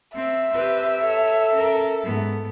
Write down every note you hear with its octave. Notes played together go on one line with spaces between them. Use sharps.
C4 E5
C4 G4 B4
A4 C#5
C#4 A#4
G#2 B3